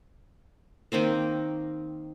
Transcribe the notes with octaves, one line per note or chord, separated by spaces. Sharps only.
D#3 A#3 C4 C5